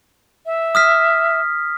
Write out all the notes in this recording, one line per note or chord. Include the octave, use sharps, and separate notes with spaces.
E5
D#6 F6 B6